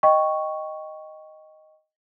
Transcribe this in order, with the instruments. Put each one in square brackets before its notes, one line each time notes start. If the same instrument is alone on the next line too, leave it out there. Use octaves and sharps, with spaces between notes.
[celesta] D#5 G5 C#6